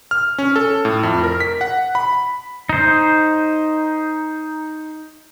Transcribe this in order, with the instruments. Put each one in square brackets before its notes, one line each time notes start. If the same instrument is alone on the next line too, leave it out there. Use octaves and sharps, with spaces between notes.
[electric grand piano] F6
C#4
A4
A2
F2
A#4
B6
F#5
B5
[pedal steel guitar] D#4 C5